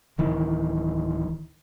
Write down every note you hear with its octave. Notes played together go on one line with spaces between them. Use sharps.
D1 D#3 E3